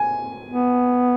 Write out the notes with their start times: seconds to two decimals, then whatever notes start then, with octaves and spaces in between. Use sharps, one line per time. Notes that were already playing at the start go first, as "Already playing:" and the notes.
Already playing: G#5
0.50 B3